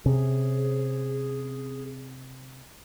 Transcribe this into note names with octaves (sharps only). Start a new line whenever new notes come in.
C3 C#4 G#4